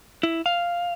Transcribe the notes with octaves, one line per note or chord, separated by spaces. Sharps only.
E4
F5